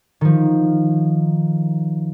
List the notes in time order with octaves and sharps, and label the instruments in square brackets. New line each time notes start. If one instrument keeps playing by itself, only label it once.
[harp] D#3 F3